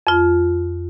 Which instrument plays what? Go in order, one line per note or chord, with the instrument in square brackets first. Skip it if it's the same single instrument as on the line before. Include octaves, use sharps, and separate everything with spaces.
[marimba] F2 F4